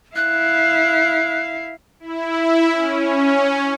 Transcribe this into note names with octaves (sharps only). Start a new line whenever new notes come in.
E4 F5 F#6
E4
C#4